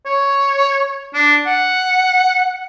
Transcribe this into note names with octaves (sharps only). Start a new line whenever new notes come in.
C#5
D4
F#5